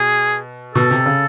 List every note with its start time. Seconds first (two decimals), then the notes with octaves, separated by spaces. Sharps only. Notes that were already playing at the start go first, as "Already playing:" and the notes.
Already playing: B2 G#4
0.75 B2 A4
0.91 C3
1.06 C#3